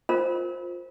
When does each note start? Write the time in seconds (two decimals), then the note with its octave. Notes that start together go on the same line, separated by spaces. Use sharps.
0.09 F4 A#4 C5